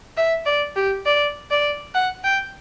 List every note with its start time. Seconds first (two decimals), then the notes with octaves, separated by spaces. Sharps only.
0.17 E5
0.46 D5
0.76 G4
1.06 D5
1.51 D5
1.95 F#5
2.24 G5